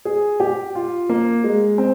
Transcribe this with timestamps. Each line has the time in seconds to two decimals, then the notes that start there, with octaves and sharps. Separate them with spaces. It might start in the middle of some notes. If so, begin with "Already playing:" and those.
0.05 G#4
0.40 G4
0.75 F4
1.09 A#3
1.44 G#3
1.78 C4